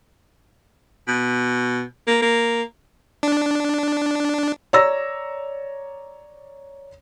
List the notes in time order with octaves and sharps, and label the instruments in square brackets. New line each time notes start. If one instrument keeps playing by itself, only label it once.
[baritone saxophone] B2
A#3
A#3
[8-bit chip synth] D4
[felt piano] C#5 D5 A#5 E6 A#6